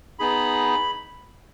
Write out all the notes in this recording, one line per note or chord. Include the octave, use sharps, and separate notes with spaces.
B3 D#4 G#4 B5